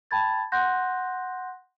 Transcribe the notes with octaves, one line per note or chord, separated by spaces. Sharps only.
G5 A5 B5 G#6 A6
F#5 C6 F#6 G6 A#6